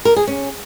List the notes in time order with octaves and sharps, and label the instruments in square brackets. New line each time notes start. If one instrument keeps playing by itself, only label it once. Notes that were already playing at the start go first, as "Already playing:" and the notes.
[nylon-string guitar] A#4
G#4
C#4